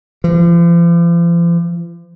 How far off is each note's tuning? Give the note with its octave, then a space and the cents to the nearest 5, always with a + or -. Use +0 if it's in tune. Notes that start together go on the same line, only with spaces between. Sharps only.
F3 -40